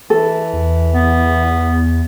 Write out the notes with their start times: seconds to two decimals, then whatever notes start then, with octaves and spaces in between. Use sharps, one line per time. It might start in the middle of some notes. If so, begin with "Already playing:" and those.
0.10 E3 A4
0.53 E2
0.94 B3